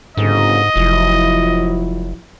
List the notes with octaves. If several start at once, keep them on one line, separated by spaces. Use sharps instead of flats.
G1 G#2 C#3 D#5
F1 F3 F#3 E4